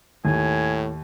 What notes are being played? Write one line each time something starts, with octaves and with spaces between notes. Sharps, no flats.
D#2 A2 G#5